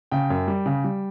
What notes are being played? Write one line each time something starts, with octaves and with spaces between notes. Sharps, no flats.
C#3 G5
F#2
G3
C#3
G3